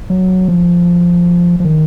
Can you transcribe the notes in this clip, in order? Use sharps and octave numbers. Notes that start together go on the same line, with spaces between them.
F#3
F3
F3
D#3